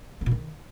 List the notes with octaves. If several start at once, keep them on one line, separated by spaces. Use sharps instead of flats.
B3
A#2
D#3